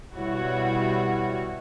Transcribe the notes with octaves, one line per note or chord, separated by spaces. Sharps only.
B2 G3 E4 F#4 C#5